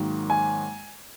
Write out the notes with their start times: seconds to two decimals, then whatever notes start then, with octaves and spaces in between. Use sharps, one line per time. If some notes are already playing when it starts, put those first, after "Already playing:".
Already playing: G#2 D#3 F#3 A#3
0.30 G#5